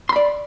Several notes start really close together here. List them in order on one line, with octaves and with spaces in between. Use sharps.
C6 B5 D5